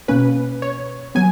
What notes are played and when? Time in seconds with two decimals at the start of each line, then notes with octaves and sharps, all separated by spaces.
0.08 B2 A#3 C#4 B4
0.62 C#5
1.15 F#3 B3 G#5